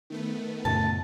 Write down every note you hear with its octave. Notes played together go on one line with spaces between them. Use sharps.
D#3 A3 B3
F#2 A#2 C#3 A5